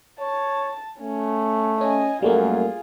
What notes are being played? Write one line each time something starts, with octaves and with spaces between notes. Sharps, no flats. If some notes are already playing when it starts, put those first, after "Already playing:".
C#5 A5
A3 C#4
C#4 D#5 G#5
F#2 G3 A3 A#3 F4 G#4